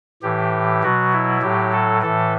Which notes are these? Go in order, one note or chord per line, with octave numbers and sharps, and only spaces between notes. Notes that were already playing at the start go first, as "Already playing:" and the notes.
A2 E3 G4
B2 F#3 F#4
E4
A2 F#3 G4
A4
A2 E3 A4